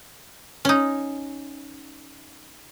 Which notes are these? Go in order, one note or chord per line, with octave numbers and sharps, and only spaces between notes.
C#4 D#4